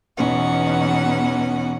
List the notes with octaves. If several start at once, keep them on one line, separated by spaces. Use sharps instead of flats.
E2 B2 E3 C#4 D#4 F#5